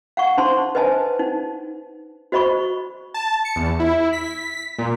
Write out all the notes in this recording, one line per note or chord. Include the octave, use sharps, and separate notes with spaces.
F5 F#5 C#6
D4 D#4 C5 A5 C6
B4 C5 D#5 G#5 A5
D#4
F#4 C5 D#5 B5 C#6
A5
C#7
E2
E4
B6
A#2